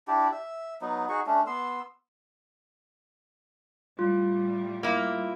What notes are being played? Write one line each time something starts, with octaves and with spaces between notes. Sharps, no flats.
D4 E4 G4 D5
E5
F#3 B3 D#4
D#4 F#4 G#4 C#6
A3 C#4 D4
B3 C6 E6
A2 G3 F4
A#3 E4